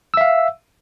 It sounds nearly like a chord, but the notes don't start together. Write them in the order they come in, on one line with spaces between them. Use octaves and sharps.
E6 E5 F5